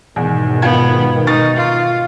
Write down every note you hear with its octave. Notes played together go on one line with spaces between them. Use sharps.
E2 G#2 B2 D#3
B3 F4 G5 G#6
D#4 C#6 F6 A6
F4